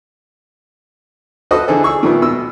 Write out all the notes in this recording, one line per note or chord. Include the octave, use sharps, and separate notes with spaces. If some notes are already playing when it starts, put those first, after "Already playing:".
F#4 A4 B4 C5 D#5
D3 E3 G#4 A4 C5
G#4 C#6 E6
A#2 D#3 F3 G3 A3 B3
B2 E6